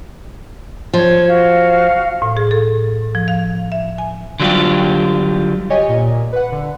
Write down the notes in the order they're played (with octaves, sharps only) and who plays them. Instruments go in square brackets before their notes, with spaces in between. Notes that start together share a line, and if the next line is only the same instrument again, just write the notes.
[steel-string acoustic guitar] F3 [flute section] C#5
[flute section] F#4 F5
[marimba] A2
G#4
A4
F3
F5
E5
G#5
[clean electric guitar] D3 F#3 G3 D#4 F4 G4
[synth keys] G4 C#5 D#5 G#5
A#2
B4 F#5
D3